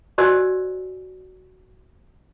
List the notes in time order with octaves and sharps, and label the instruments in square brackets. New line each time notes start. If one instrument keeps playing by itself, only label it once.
[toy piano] F#4 C5 D5 D#5 G#5 E6